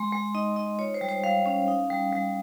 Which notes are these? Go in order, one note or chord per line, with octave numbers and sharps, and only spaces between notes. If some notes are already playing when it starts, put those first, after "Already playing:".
Already playing: G#3 C6
G#3
D#4 D#5
D#4 D#5
F4 C#5
C5
G3
C5
G3 F5
C#4
D#4
G3
G3